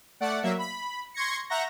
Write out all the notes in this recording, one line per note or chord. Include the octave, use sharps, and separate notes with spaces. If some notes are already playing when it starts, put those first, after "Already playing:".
A3 D5 F#5
F#3 A#3 E5
B5
C6 C#6 G#6 A#6 C#7
E5 F#5 A#5 C#6 G6 A#6